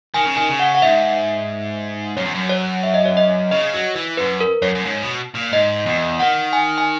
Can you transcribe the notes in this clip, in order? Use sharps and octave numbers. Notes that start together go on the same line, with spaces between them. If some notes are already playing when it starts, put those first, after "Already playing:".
D#3 G#5
C#3
D#3 G#5
C#3
F#5
F#5
G#2 E5
F#2 C#5
E2
F#2
C#5
E5
D#5
C#5
D#5
C#3 D#5
F#3
E3
F#2 B4
A#4
F#2 C#5
F#2
G#2
B2
A#2
G#2 D#5
E2
D#3 F#5
G#5
G#5